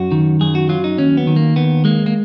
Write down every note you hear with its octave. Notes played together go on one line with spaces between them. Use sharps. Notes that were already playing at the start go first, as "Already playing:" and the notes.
Already playing: F#2 F#4
D#3
F#2 G#4
F#4
F#3 F4
D#4
D#2 C#4
B3
D#3
A#3
D#2 B3
G#3 A#3
A#3